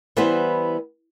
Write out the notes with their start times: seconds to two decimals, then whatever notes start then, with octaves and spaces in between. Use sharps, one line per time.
0.17 E3 G3 B3 B4 C5